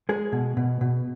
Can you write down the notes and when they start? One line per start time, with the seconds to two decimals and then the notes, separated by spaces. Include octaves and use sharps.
0.09 G#3 G#4
0.32 B2
0.57 B2
0.81 B2